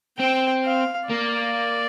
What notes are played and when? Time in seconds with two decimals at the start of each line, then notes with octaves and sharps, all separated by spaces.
0.19 C4 G5
0.64 F5
1.09 A#3 D5